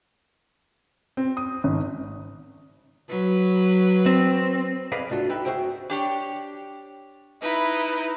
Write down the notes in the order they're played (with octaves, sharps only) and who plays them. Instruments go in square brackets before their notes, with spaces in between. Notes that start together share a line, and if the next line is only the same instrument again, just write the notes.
[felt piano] C4
D#6
G#1
[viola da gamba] F#3 B4
[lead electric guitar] C4
[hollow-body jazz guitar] G#4 B4 D5 D#5 F5
C2 G#2 A3 D4 F4 F#4
D#4 F#4 G4 B4 E5 G5
F#4 G#4 C5 E5 G5
[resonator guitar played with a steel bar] D4 G4 C#5
[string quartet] D#4 E4 B4